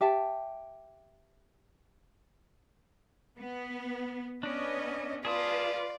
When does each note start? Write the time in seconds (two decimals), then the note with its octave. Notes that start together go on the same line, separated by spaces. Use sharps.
0.01 G4 E5 A5
3.38 B3
4.43 B3 C#4 D4 D5 D#5
5.25 F4 G#4 B4 D5 A5 D#6